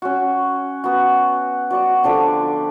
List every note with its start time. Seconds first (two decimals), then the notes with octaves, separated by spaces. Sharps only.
0.02 C#4 F#4
0.84 B3 F#4
1.70 F#4 D5 C#6
2.03 D3 F3 D4 G4